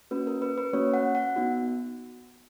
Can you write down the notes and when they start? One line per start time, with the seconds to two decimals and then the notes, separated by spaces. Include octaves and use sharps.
0.11 A#3 C#4 F#4 B4
0.27 A#4
0.42 B4
0.58 B4
0.73 A#3 C#4 F#4 C#5
0.94 F#5
1.15 F#5
1.36 B3 D#4 F#4